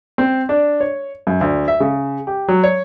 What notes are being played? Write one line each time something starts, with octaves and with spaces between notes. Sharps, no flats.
C4
D4
C#5
F#2
D2
E5
C#3
G4
F#3
C#5